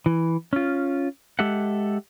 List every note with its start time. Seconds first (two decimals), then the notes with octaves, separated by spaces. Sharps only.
0.06 E3
0.53 C#4 F4
1.39 G#3 G4 A4 E5 F#5